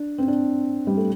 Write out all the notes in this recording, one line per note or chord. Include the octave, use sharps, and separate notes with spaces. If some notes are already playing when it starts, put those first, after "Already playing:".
Already playing: D4
C4
D4
G3
A3